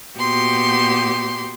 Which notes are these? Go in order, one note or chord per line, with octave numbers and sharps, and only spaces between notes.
A#2 B3 F#4 G4 C6 G6